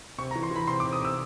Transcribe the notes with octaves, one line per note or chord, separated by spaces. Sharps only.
C3 C#6
A#5
E3
C6
E3 B5
C3 C6
D6
C3
D#6
C3 E6